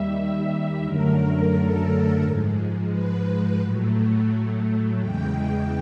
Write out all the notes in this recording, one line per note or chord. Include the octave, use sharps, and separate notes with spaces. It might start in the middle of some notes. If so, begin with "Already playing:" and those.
Already playing: D#2 D#3 G3 E5
F#2 D3 F#3 A3 A#4
A4
G#2 F3 G#3
B4
A2 F#3 A3
E2 C#3 E3 G#3 G5